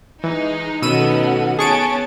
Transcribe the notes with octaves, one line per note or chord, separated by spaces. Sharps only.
E3 G#3 D#4
B2 D#3 A3 B3 C#4 F#4 E6 D#7
B3 C#4 G#4 A5 C#6 D7